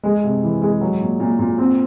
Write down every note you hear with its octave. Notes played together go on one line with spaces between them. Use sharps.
G#3
C3
E3
G#3
F#3
A#2
A#2
A#2
C4